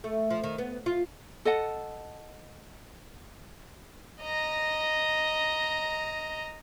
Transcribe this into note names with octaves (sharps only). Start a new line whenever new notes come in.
A3
F3
D#3
B3
F4
A4 D#5 F#5 A5
D#5 A#5